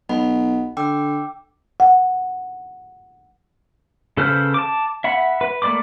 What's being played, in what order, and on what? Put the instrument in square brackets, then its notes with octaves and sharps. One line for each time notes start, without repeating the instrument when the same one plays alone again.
[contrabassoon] B1 [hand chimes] D#5 F#5 B5
[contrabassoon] D3 [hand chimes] G5 D6 E6
[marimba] F#5
[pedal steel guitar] C#3 A4 B4 C5 F6
A5 D6
E5 F#5 B5
B4
A3 A#3 D5 B5 D6